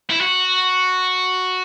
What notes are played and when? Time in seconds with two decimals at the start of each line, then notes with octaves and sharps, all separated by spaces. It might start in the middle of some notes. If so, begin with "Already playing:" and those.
0.10 E4
0.21 F#4